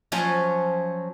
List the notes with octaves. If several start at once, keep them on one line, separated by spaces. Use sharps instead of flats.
F3 F#3 C#4